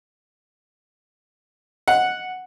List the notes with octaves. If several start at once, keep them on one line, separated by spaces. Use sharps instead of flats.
F#5